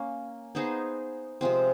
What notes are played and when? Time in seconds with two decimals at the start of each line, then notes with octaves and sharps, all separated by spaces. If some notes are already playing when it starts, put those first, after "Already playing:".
Already playing: A#3 C#4
0.55 B3 D#4 G#4 C5
1.41 C3 F3 G#3 C4